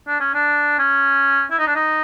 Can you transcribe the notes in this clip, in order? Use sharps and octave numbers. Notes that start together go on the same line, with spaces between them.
D4
C#4
D4
C#4
E4
D#4
D4
D#4